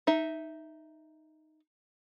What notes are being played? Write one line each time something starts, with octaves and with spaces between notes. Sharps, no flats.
D#4 E5